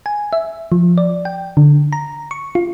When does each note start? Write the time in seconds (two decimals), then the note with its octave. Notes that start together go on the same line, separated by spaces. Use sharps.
0.06 G#5
0.33 E5
0.72 F3
0.98 D5
1.25 G5
1.57 D3
1.93 A#5
2.31 C#6
2.55 F4